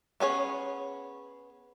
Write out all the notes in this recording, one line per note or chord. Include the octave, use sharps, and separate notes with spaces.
B3 C#4 G#4 C#5